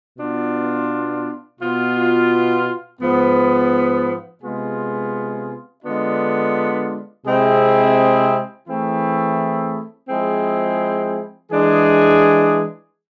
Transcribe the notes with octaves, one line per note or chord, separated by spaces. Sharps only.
B2 B3 D4 F4
B2 B3 F4
G#2 F3 B3
C3 G#3 B3 F4 G#4
D3 G#3 B3 D4 F4
C3 G#3 C4 E4 G#4
E3 A3 C4 E4 G#4
F3 G#3 C4 E4 G#4
E3 G#3 D4 G#4